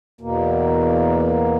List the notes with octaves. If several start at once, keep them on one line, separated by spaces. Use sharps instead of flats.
E2 B2 A#3